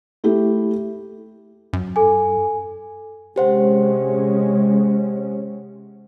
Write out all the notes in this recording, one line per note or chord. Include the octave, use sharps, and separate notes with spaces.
A3 E4 G4
F#2
A4 G#5
C3 G#3 C#4 G4 C5 F#5